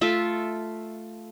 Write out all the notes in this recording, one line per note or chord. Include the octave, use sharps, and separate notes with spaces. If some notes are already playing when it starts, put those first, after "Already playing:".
A3 F4 A4 E5